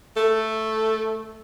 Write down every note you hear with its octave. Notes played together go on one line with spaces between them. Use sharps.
A3